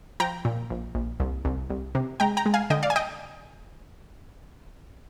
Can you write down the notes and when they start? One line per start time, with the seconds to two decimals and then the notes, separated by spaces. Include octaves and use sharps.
0.20 F3 G5 A#5
0.45 A#2
0.70 A#1
0.95 A#1
1.20 C2
1.45 C2
1.70 C2
1.95 C3
2.20 G#3 G5 A#5
2.37 G5 A#5
2.46 G#3
2.54 F5 G#5
2.70 D3 D#5 G5
2.83 D5 F5
2.90 G#5
2.96 D#5 G5